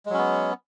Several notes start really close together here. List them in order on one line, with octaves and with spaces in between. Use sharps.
G#3 F#3 C#4 B3